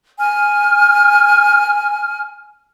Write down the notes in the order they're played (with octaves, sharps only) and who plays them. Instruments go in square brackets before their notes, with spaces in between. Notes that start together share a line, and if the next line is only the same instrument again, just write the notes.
[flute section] G#5 F6